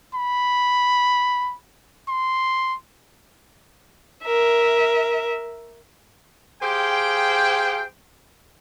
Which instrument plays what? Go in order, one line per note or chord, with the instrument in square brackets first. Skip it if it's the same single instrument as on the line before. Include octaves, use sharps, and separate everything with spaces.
[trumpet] B5
C6
[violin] A#4 E5
[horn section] G4 G#4 C5 F5 G5